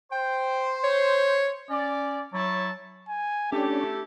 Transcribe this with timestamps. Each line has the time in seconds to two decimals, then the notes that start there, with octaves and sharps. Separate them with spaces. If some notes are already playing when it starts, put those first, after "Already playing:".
0.12 C5 G5
0.84 C#5
1.70 C#4 D5
2.33 F#3 E4 C#5 A5
3.08 G#5
3.52 A3 C#4 D4 E4 G4 A4